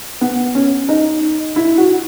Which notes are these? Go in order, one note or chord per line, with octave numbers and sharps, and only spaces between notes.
B3
C#4
D#4
E4
F#4